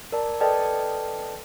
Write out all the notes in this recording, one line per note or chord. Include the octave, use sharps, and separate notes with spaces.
A#4 D5 A5
A4 B4 D5 D#5 G5 A5